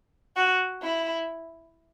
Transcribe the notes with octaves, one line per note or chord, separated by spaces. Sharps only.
F#4
E4